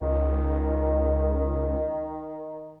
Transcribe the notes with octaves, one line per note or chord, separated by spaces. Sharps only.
C#2 D#3